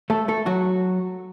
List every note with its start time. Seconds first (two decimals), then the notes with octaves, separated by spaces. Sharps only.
0.10 A3 A4
0.28 A3 A4
0.46 F#3 F#4